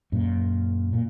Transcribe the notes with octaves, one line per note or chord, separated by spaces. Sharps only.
F#2 A#2
A#2